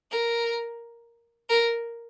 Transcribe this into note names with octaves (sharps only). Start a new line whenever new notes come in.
A#4
A#4